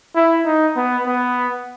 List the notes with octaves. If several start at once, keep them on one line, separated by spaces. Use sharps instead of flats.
E4
D#4
B3
B3